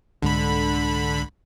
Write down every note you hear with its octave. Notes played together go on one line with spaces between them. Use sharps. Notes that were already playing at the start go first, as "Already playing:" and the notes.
C2 G#2 D3 G#3 B5